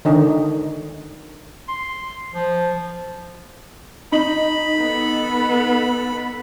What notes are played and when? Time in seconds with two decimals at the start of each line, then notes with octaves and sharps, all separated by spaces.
0.05 D3 D#3 D#4
1.69 C6
2.34 F3
4.12 D#4 B5 F#7
4.77 B3 A4